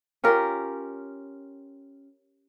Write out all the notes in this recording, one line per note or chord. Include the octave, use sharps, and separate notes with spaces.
C#4 F4 G4 A#4